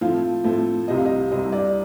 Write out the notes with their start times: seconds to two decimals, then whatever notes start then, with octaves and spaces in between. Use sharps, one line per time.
0.01 A2 F3 A3 C4 F5
0.44 A2 F3 A3 C4
0.88 C2 C3 G3 C4 D#5
0.98 F5
1.06 D#5
1.31 C2 C3 G3 C4 D#5
1.52 D5